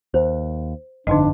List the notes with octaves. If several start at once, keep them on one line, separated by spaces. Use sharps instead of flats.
D#2 C5
G1 F2 D3 D4 D#4 D#5